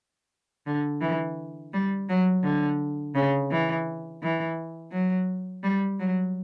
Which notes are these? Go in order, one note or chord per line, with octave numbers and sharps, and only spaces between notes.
D3
E3
G3
F#3
D3
C#3
E3
E3
F#3
G3
F#3